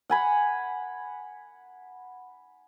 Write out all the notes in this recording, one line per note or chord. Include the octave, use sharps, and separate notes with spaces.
F#5 G#5 B5